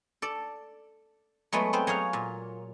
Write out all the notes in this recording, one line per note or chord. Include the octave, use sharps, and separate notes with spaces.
A4 D5
F#3 G#3 A3 B3
B3 C4 C5
F#3 G#4 C#5 F5
A#2